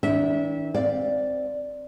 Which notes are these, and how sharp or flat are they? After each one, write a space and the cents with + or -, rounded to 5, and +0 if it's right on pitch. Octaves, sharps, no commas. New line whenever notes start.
D#3 +35 D4 -35 E5 -20
C4 +0 D5 -5 F5 +0